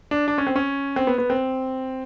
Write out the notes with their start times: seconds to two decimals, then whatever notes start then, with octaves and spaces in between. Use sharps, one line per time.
0.11 D4
0.28 D4
0.38 C#4
0.47 C4
0.56 C#4
0.96 C4
1.07 B3
1.18 B3
1.30 C4